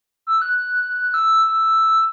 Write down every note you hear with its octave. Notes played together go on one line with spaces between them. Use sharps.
E6
F#6
E6